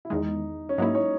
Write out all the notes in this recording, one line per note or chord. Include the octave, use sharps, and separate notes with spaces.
E4
E2 D#3 G#3 D#4
C#4
G#2 F#3 A#3 D#4 E4
C#5